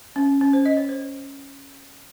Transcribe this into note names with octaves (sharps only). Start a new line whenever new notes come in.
C#4
C#4
C5
D#5
C#5
C5